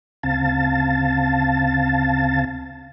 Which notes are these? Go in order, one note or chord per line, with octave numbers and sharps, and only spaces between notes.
D2 C#3 C4 F5 A5 A6